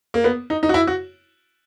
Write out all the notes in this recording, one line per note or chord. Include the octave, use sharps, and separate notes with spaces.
A#3
B3
D#4
D#4
F#4
E4
F#4